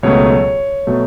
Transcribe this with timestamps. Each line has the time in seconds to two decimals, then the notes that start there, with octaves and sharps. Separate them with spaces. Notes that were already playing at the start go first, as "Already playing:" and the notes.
0.03 C#2 B2 F#3 A3 C#5
0.87 B2 F#3 A3